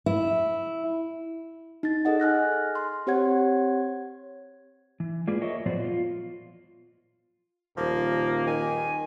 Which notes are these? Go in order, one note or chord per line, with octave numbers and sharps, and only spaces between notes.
E4
D#4 A6
G#4 A4 D#5 F#5
G#5 F6 F#6 A#6
C6
C4 G4 C5 C#5 F#5 G#6
E3
G#3 A#3 F4 G#4 B4 D5
A#4 C#5 D#5 E5
A#2 F3 F#3 B3 C5 D5
F4
D#1 F3 A#3
D#3 G#5